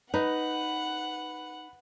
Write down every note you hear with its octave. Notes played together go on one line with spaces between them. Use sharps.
D#4 B4 F#5